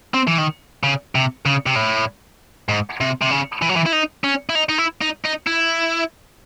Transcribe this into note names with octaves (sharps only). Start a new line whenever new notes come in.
C4
E3
D#3
C#3
C3
C#3
C3
A2
G#2
C3
C3
C#3
E3
F#3
E3
E4
D#4
C#4
E4
D#4
D#4
E4
D#4
D#4
E4